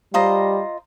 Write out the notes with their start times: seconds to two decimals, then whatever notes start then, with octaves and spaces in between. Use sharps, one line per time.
0.14 G3 F4 C5 D#5 A#5